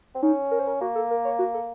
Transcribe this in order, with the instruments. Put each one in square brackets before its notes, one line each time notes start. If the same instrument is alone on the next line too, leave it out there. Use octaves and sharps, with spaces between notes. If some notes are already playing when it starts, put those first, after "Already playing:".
[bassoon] C4
[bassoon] C#4 [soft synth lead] D#4
[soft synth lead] A#4
C5
A#4
[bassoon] A#3 [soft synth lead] F#4
[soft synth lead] A4
A#4
C#5
F#4
A4